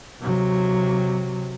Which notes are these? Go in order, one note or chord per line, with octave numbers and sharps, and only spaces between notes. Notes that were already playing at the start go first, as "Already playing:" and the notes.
C3 F#3